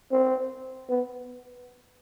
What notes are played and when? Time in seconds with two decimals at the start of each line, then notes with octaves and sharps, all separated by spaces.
0.12 C4
0.89 B3